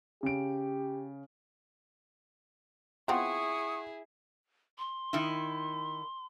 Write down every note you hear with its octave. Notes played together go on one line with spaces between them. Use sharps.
C#3 G4 D7
B3 C4 E4 F4 G#4 F#5 C#6 D#6
C6
D#3 E4